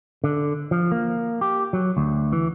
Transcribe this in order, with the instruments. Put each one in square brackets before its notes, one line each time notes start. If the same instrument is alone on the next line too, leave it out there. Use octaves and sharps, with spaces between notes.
[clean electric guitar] D3
F3
A#3
G4
F#3
D2
E3